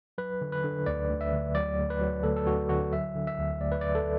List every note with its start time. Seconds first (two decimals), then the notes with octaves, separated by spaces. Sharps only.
0.18 F#3 B4
0.41 D3
0.52 B4
0.64 D3
0.86 D2 D5
1.09 D2
1.21 E5
1.32 D2
1.55 F#3 D5
1.78 D2
1.90 B4
2.01 F#3
2.23 D2 A4
2.36 A4
2.46 D2 F#4
2.69 D3 F#4
2.93 F#3 E5
3.15 D3
3.27 E5
3.39 D2
3.61 D2 D5
3.72 B4
3.81 D2 D5
3.95 A4